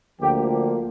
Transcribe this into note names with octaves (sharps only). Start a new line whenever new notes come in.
D2 D3 F3 A#3 G4